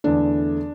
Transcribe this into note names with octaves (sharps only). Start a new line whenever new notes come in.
E2 D3 A3 D4